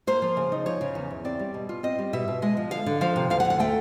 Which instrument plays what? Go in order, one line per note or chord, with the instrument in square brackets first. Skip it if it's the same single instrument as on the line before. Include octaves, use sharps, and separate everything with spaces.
[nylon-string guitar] A#3 C5
F3
C#3
D#4
F3 C#5
C#3
E2
E2
C4 D5
G3
B2
F4
C4 D#5
G3
B2 E5
B2
G#3 D#5
F3
D3 F5
D3
F3 F5
C3
D2 F5
F#5
D2
F#5
A3 G5